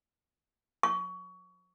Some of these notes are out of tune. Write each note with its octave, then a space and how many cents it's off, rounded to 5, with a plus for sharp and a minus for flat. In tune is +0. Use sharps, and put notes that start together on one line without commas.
C#6 +25